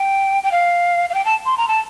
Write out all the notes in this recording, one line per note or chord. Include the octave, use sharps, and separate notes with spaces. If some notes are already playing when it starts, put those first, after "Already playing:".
Already playing: G5
G5
F5
F5
G5
A5
C6
A#5
A5